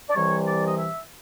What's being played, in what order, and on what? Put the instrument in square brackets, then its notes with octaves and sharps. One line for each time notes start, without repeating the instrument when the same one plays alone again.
[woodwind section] D5
C2 C3 E3 G3 C#5
D5
D#5
E5